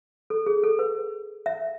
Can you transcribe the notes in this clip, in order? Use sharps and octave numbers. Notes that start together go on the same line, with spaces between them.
A4
G#4
A4
B4
E5